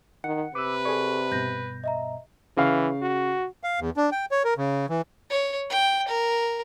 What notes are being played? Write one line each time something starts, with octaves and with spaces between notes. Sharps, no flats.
D#3 F#5 C#7
C3 B4 D6 E6
G#4 A4 D5 C#6
G2 B2 G6 A#6
D#5 E5 A#5
C#3 E3 F5
F#4
F5
E2
D4
G5
C#5
A#4
C#3
E3
C#5
G5
A#4